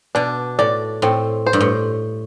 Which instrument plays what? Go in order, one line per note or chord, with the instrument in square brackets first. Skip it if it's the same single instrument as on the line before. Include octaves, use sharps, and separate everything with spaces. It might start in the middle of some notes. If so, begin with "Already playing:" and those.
[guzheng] B2 [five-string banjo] D4
[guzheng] A2 [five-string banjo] D5
[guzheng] A2 [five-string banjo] C4
[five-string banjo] C5
[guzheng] G2
A2